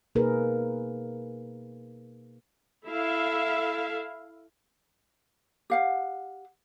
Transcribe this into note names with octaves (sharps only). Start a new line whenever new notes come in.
B2 A#3 D#4 G#4 A#4 B4
E4 A4 E5 F5
G4 F5 F#5